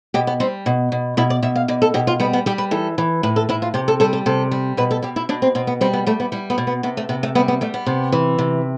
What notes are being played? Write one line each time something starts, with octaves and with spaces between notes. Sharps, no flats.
B2 G4
B3
G3 C4
B2
B2
B2 E4
D5
B2 E5
F5
B2 D5
A4
B2 G4
F4
G3 B3
B3
G3 G4
B4
E3 A4
E3
A2 B4
A4
A2 E4
F4
C3 G4
A4
G3 A4
A4
C3 A4
G3
B2 B4
A4
B2 G4
E4
B2 D4
C4
B2 C4
B3
G3 C4
B3
G3 A3
B3
G3 E4
B3
B2
B3
C3 B3
A3
C3 B3
A3
G3 B3
B3
G3 A3
B3
C3
E3
C3